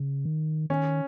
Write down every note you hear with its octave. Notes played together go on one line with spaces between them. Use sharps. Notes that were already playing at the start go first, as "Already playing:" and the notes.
Already playing: C#3
D#3
D#3 C#4